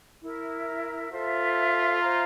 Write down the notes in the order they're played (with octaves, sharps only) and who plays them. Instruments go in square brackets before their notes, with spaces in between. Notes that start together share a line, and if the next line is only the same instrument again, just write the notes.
[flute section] E4 A#4 E5
[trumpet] F4 [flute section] A4 C5 E5
[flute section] C5 E5 A#5